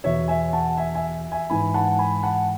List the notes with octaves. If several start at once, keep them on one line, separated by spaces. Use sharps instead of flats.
E2 B2 C#5 E5
E5 G#5
F#5 A5
E5 G#5
E5 G#5
E5 G#5
G#2 E3 G#5 B5
F#5 A5
G#5 B5
F#5 A5